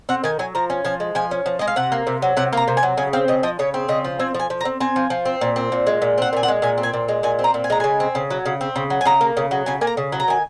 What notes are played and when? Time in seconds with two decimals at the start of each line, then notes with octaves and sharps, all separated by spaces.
0.09 C4 F#5
0.24 D#3 G#5
0.39 F#3 G#5
0.55 F3 A#5
0.70 C#4
0.84 F3 G#5
1.00 G#3
1.15 F3 G#5
1.31 C#4
1.46 F3
1.59 G#3 D#5
1.67 F5
1.76 C3 F#5
1.92 A#3
2.07 C3
2.22 F#3
2.37 C3 F#5
2.53 A#3 A#5
2.68 C3
2.77 G#5
2.83 F#3
2.97 C#3 G#5
3.13 C4 F5
3.28 C#3 D#5
3.43 F3 D#5
3.59 C#3 C#5
3.74 C4
3.89 C#3 D#5
4.05 F3
4.19 C4 G#5
4.34 F3
4.39 G#5
4.50 F3
4.61 A#5
4.65 C4
4.80 C4 G#5
4.96 F3
5.10 F3
5.25 C4
5.41 A#2
5.56 C4
5.72 A#2
5.87 G#3
6.02 A#2
6.18 C4 F#5
6.33 A#2 G#5
6.43 F#5
6.48 G#3
6.62 A#2 G#5
6.78 C4
6.83 G#5
6.93 A#2
7.08 G#3
7.23 A#2 G#5
7.39 C4
7.44 A#5
7.54 A#2
7.64 G#5
7.70 G#3 A#5
7.80 C#3 G#5
8.00 C4
8.15 C#3
8.30 F#3
8.46 C#3
8.61 C4
8.76 C#3
8.90 F#3
9.01 G#5
9.05 C#3 A#5
9.21 A#3
9.37 C#3
9.51 F#3
9.66 C#3 G#5
9.81 A#3 G#5
9.87 A#5
9.97 C#3
10.12 F#3
10.20 A#5
10.28 D#3 G#5